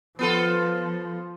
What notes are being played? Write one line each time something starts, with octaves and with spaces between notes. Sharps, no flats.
F3 B3 F4 A4